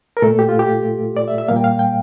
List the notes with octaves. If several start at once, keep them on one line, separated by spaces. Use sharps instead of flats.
A#4
A#2 A3 A4
G4
F4
G4
D5
E5
E5
A#2 G3 A#3 F5
G5
F5
G5